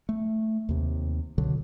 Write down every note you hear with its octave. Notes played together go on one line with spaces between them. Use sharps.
A3
D#2 C3
C#2 B2 D3 F#3